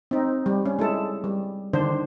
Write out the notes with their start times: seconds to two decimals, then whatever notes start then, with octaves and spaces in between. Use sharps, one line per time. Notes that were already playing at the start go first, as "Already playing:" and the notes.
0.11 C4 D#4
0.46 G3
0.66 C#4
0.79 G#3 E4 A4
1.24 G3
1.73 D3 D#3 D4 C5